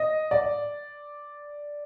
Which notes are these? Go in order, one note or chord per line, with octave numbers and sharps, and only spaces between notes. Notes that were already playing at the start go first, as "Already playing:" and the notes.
Already playing: D#5
D5